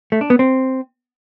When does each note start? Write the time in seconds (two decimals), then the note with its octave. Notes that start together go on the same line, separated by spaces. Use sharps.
0.12 A3
0.21 D4
0.30 B3
0.39 C4